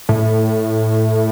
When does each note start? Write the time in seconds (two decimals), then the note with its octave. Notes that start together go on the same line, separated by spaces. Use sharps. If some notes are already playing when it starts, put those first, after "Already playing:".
0.09 A2